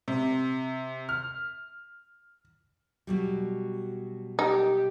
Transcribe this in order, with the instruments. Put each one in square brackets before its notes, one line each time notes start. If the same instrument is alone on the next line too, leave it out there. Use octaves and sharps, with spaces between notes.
[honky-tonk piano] C3
F6
[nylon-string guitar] B2 F#3 G3
[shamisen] D#4 [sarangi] G4